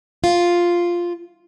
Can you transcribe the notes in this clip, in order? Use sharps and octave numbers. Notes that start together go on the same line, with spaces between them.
F4